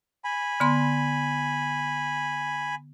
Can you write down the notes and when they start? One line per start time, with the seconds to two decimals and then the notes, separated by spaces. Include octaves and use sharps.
0.24 G#5 B5
0.60 D3 B3 C6